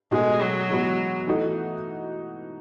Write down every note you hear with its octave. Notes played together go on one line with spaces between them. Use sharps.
B2 G#3 A3 D#4 F#4
F#3
E3 G#3 B3 F#4
E3 A3 D#4 F#4